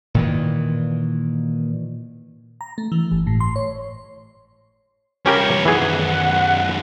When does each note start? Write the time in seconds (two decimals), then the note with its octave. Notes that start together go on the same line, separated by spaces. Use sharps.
0.15 A#2 D#3 E3
2.61 A#5
2.78 A3
2.92 E3
3.12 G1
3.27 A2
3.40 C6
3.56 C#5
5.26 C2 C#4 G4 A#4 C#5
5.65 F#2 D#3 E3 G#4 F#5